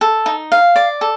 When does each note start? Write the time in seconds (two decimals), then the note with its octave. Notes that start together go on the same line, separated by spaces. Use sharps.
0.01 A4
0.26 D#4
0.52 F5
0.76 D5
1.01 A4